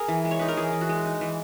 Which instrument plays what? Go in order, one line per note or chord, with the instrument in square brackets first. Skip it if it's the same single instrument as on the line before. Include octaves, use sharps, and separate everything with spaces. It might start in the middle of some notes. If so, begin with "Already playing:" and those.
Already playing: [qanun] G#4 A#4
E3
G#3
C#5
D#4 B4
A#4
E3 G#4
E3
F#4
G#3
D#4
E3